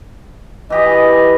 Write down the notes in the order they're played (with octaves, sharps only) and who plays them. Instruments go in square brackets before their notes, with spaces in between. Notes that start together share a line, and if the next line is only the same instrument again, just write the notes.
[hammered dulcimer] E3 G4 G#4 [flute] D#5